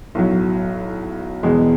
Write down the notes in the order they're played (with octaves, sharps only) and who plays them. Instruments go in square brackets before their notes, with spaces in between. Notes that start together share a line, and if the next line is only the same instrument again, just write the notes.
[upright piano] B1 A2 F#3
E1 E2 B2 G#3